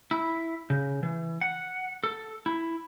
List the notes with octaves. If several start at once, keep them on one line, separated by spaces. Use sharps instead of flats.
E4
C#3
E3
F#5
A4
E4